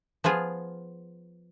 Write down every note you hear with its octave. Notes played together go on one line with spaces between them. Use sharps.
F3 B3 F4 G#4